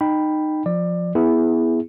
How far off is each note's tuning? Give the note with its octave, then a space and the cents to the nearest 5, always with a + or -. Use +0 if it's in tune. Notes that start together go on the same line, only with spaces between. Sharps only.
D#4 -20 G5 +0 B5 +0
F3 +10 D5 +20
B3 +0 E4 +0 G#4 +0